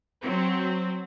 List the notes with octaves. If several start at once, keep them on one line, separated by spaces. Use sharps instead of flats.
F#3 C4